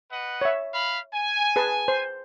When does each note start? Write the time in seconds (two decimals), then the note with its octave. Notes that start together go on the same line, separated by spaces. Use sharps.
0.11 B4 D#5 F#5
0.41 C#5 E5
0.74 F5 B5
1.14 G#5
1.56 G#4 B4 A5
1.88 C5